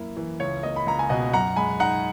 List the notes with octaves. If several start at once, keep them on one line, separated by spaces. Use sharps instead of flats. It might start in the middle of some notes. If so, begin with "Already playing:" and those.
Already playing: F#2 A#3 E4
E3
C#2 C#5
A#3 D#5
B5
C#2 A#5
G#5
B2 D#5 F#5
F#2 F#5 A#5
G#3 G#5 B5
D#4 F#5 A#5